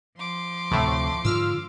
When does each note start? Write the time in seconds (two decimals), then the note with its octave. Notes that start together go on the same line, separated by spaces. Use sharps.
0.16 F3 C6 D6
0.71 D2 A2 C3 A3
1.25 G#2 D3 F4 E6 F6